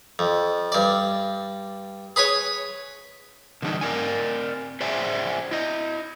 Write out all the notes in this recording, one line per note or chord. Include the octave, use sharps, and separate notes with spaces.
F2
G2 D5
G#4 B4 C#5 G#5
D3 E3 G3 A#3 D4 D#4
C4 A#4 D5 G#5
G#4 C5 D5 E5 F#5 G#5
E4 D#5